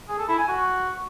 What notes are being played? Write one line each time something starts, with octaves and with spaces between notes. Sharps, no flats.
G#4
A4
E4
G#5
F#4